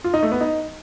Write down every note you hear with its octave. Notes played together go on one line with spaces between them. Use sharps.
F4
D#4
A3
B3
D#4